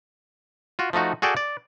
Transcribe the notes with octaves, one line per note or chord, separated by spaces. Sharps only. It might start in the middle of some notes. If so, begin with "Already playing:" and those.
F4 F#4
F3 A3 D#4 F#4
F#4 G#4 A4 D5 G5
D5